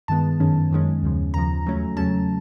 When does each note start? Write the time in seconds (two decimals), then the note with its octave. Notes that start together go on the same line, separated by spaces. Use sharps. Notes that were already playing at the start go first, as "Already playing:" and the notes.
0.08 G2 D#3 G#3 B3 A5
0.40 F#2 D#3 G#3 C#4
0.71 F#2 D#3 G#3 C#4
1.03 D#2 C#3 F3
1.34 D#2 C#3 F3 A#5
1.65 E2 C#3 F#3 A3 C#4
1.97 E2 C#3 F#3 A3 C#4 A5